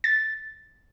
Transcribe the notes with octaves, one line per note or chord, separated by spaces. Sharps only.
A6